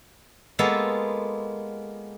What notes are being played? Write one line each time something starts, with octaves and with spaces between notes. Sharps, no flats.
G#3 A#3 B3 F4 A4